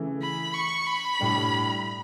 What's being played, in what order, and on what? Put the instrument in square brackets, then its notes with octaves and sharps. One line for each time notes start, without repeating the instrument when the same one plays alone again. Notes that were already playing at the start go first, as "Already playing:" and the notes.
Already playing: [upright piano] C#3 E3 A3
[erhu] B5
C#6
B5
[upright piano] A2 G3 D4